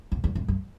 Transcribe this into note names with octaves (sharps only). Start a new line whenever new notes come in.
F2
E2
F2
F#2